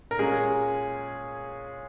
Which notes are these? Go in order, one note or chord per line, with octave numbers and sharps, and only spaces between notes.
A#4
A#2 G#3 C#4 G#4